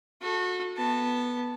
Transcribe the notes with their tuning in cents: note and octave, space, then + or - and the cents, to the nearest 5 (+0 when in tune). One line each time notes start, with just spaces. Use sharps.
F#4 -30 A4 +0
B3 -10 A5 +0